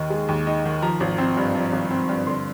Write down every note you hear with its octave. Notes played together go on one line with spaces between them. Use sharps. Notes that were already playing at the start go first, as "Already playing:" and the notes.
Already playing: D#2 D#3 D#4
G#3
D#2
D#4
D#3
F3 A#5
G#1
C4
G2
F3
G#1
C4
G2
D3 C6